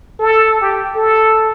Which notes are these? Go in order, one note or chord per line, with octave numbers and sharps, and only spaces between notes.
A4
G4
A4